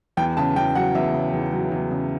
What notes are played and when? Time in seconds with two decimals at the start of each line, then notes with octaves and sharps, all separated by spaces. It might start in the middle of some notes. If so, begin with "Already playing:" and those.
0.17 E2 G5
0.37 C#3 A5
0.56 E2 G5
0.75 F#3 F#5
0.95 E2 E5
1.14 C#3
1.33 E2
1.53 F#3
1.72 E2
1.91 C#3